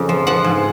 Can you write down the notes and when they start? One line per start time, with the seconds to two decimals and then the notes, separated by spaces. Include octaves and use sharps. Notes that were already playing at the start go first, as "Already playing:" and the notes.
Already playing: F2 C#3
0.09 F3
0.27 F3 F#5
0.44 G#2